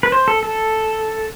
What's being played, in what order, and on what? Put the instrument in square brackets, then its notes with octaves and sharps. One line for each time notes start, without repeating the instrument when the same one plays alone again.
[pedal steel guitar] B4
C5
A4
A4